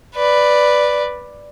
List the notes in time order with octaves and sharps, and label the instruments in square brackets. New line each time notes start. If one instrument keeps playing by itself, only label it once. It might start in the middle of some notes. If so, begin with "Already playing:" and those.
[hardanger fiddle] B4 D5